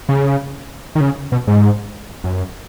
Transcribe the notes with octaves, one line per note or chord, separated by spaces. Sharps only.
C#3
D#3
C#3
B2
G#2
F#2